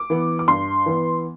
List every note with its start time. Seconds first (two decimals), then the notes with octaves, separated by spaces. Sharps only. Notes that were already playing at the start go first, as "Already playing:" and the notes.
Already playing: D6
0.10 E3 B3
0.39 D6
0.48 G2 C6
0.86 E3 B3